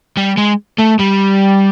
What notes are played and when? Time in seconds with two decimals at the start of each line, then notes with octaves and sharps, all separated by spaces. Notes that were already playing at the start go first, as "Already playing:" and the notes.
0.17 G3
0.37 G#3
0.78 A3
0.99 G3